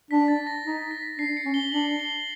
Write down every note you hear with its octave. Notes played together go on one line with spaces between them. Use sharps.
D4 B6
A6
A#6
D#4
B6
D4 C7
C#7
C#4
G7
D4 F#7
G7